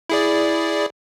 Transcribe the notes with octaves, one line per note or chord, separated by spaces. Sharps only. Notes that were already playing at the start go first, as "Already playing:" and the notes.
E4 G#4 D5